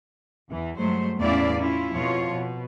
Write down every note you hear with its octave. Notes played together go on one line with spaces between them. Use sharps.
E2 E3
G2 F#3 G#3 A3 C5
E2 A2 C#4 E4 D5 F5
C#4 E4 F4
F2 B2 F3 F4 C#5
B2